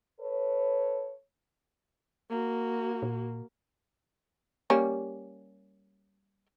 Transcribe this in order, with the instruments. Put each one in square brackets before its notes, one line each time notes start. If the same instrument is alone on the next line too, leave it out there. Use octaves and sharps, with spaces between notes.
[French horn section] A4 B4 C#5
[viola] A#3 F#4
[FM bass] A#2
[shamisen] G3 A#3 C#4